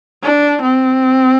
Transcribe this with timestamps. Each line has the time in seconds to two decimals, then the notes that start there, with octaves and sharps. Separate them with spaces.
0.23 D4
0.62 C4